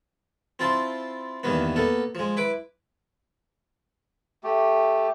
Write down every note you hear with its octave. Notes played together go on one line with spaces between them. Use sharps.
C4 E4 F4 A5 C6
E2 G2 D#3 A#3 B3
A#3 B3 A4
F3 G#3
E4 B4 D6
A3 G4